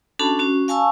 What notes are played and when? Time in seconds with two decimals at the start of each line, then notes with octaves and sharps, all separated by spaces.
0.19 C#4 D4 F#4 A4 A5 B5
0.39 C#4 F#4
0.68 F5 G#5 A5 C#6 E6